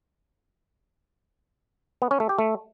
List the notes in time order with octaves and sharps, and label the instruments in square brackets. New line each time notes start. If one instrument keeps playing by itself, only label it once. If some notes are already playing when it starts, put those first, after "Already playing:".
[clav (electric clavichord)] B3
C#4
A3
G4
A3